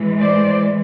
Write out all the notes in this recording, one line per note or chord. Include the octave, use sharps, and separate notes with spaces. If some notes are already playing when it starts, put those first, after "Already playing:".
Already playing: A2 E3 G#3
C5 D5